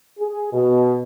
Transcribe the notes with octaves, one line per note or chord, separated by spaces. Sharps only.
G#4
B2